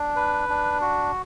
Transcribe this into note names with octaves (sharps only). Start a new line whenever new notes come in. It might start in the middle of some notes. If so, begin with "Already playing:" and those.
Already playing: D4
B4
D4
F#4